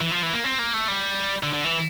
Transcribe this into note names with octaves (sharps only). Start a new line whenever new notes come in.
E3
F3
E3
A#3
C4
A#3
A3
G3
D3
D3
E3